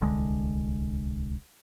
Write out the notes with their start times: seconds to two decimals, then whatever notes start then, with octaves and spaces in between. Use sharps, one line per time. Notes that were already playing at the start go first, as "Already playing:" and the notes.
0.01 D1 C2 D3 G#3